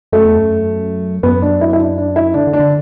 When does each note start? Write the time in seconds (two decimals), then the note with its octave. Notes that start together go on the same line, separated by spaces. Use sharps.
0.12 F#2 A3
0.25 E2
0.37 F#2
1.23 F#2 B3
1.42 D4
1.61 E4
1.73 E4
1.79 D4
1.98 D4
2.16 E4
2.34 D3 D4
2.47 D3
2.53 D4
2.59 D3